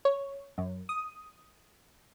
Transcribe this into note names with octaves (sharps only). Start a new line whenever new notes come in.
C#5
F#2
D#6